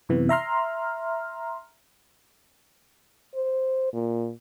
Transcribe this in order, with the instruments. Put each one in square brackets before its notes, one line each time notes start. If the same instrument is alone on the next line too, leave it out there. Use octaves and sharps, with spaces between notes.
[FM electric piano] F#2 C3 E3 B3
E5 A#5 C6 F6
[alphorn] C5
A#2